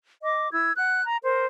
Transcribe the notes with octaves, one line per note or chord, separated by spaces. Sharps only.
D#5 D6
E4 E6 G#6
F#5 F#6
A#5
A#4 C5